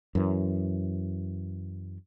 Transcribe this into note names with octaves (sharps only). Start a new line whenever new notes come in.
F#2 E3